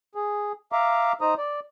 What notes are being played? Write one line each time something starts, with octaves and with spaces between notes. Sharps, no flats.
G#4
E5 F5 A#5 D6
D#4 C5 A#5 D#6
D5